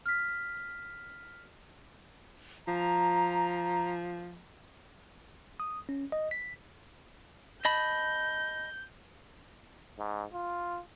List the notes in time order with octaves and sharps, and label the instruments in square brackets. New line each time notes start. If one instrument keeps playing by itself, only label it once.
[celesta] F6 B6
[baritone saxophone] F3 [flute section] A#5
[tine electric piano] D#6
C#4
D#5
B6
[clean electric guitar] D#5 A5 B5 [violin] G6
[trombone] G#2
F4